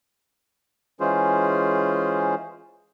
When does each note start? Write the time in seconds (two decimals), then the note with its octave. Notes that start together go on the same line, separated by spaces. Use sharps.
1.00 E3 G#3 C#4 F4 G#4 C5